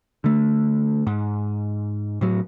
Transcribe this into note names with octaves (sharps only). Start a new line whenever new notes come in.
D3 A3
G#2
A2 F#3